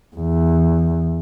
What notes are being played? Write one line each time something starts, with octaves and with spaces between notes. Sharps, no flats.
E2